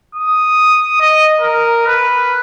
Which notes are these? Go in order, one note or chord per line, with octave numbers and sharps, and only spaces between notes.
D#6
D#5
A#4
B4